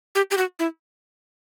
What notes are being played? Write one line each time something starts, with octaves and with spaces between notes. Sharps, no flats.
G4
G4
F#4
E4